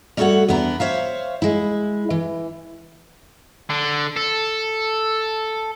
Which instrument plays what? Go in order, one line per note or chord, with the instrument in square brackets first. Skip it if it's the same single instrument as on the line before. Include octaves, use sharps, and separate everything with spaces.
[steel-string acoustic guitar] G3 A3 F#4 A4 C#5 F#5
E2 E3 B3 D4 A#5
C5 C#5 E5 F5
G#3 E4
E3
[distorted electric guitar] D3
A4